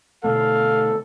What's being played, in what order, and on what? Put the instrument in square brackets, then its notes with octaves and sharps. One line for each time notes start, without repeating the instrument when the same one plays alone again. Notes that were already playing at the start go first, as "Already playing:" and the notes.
[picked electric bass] B2 D3 A3 [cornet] A4 [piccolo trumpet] F5